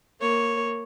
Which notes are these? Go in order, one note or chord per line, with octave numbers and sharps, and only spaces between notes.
A#3 C#5